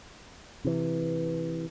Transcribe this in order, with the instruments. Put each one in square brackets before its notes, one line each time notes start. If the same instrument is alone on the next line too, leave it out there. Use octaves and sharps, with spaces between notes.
[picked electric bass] C3 E3